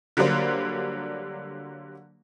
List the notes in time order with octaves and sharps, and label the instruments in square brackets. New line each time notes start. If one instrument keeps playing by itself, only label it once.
[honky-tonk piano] D3 F#3 G3 A#3 D4 C5